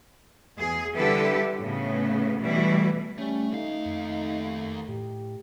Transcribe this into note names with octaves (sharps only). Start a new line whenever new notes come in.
E2 G#4
D3 G3 E4 G4 A4 B4
A2 C#3 B3
B2 E3 G3 A3 E4
G3 A3 C#4
D#2 A3 D#4 F5
F2
A2 G4